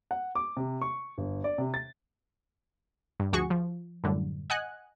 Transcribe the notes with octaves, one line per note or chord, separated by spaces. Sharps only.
F#5
D6
C3
C#6
G1
D5
C3
A6
G2
D2 F3 F#4 G#4 C#6
F3
F#2 A2 D3 G3
D#5 F#5 G#5 F#6